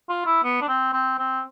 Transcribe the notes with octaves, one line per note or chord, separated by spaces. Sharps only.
F4
E4
B3
D4
C4
C4
C4